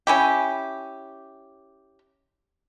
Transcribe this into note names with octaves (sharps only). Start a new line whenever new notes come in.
C#4 E4 G4